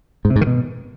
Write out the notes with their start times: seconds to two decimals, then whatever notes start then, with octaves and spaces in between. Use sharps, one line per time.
0.25 G#2
0.30 C3
0.36 G#2
0.41 D#3
0.47 B2